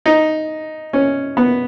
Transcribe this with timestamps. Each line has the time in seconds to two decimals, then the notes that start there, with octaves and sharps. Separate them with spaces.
0.06 D#4
0.93 C#4
1.37 B3